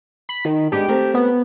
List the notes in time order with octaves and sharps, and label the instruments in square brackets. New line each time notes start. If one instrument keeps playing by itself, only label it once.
[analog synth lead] B5
D#3
[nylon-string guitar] G#3 B3 D4 [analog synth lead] G4
[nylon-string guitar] A3 C4 A#4
[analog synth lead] B3